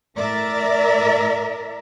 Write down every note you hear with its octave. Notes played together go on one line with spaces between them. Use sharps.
A2 A#4 D5 E5